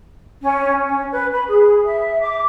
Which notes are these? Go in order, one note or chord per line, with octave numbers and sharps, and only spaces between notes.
C#4
C#4
B4
B5
G#4
E5
D6